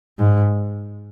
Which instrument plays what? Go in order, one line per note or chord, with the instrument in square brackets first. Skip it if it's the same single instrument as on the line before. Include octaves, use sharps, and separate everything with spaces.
[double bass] G#2